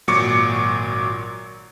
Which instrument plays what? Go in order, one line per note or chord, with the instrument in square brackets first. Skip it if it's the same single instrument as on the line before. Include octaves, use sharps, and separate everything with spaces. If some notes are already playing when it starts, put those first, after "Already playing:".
[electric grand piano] G#1 A#2 F#3 C#6 D6 C#7